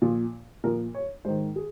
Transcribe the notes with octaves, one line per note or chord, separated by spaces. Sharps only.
A#2 F3 F4
A#2 F3 A#4
C#5
G#2 D#3 C5
G#4